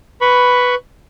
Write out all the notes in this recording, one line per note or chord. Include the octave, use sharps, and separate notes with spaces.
B4 B5 C#6